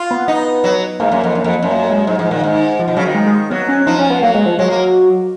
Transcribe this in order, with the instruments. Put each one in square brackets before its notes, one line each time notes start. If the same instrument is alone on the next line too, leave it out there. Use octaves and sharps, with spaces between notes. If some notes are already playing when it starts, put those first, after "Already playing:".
Already playing: [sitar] F4
[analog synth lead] B3
[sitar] D#4
F#3
[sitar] G#2 [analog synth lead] A#3
[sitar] F#2
F2
F#2
F2
F#2
[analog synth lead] A#3
G#3
[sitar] G#2 [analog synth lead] F#3
[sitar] G#2 [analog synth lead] F3
[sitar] A#2 [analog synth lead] D#3
[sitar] G#2
[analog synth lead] F3
[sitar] B2
[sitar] C#3 [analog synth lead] F#3
[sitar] D#3
[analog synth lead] G#3
G#3
[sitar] F#3 [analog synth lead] B3
[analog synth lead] C#4
[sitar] F3 [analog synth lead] D#4
[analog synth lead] C#4
B3
[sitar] F#3 [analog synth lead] A#3
[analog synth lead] G#3
F3
[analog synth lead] F#3 [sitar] G#3
[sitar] A#3